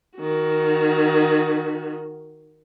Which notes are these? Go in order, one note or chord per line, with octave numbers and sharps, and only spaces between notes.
D#3 F#4